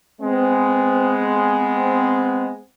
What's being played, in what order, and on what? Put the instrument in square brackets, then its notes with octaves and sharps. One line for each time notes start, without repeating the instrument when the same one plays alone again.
[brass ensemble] G#3 B3 C4